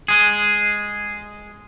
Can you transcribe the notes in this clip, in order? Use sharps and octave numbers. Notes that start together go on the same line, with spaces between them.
G#3 G#4